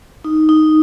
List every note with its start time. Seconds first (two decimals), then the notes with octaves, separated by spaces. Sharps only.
0.24 D#4
0.49 D#4